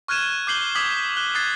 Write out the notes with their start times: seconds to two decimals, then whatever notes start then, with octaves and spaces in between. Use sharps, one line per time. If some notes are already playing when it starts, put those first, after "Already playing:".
0.08 C#6 F6 F#6 G#6 D#7 E7
0.47 D6 G6 C7 F#7 G7
0.75 D6 D#6 G#6 B6 F#7
0.96 B6
1.16 F#6 G7
1.34 D#6 F#6 G#6 A6 C7